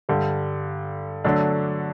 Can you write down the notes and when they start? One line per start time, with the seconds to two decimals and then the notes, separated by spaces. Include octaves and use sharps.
0.09 G2 D3 G3
1.25 D3 F#3 A3 D4